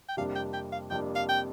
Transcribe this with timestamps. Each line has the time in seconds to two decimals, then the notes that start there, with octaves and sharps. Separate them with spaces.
0.09 G5
0.17 F2 C3 G3 A#3 D4 F5
0.36 G5
0.53 G5
0.72 F5
0.90 F2 C3 G3 A#3 D4 G5
1.16 F5
1.29 G5